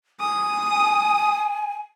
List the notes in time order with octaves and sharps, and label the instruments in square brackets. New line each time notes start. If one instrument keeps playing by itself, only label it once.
[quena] G#5 [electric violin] D#6